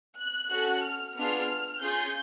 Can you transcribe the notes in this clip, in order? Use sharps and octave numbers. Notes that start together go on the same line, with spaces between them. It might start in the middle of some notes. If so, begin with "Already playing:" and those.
F#6
C#4 F#4 A4
F6
B3 D4 F4 G#4 F6
C#4 F4 G#4 G6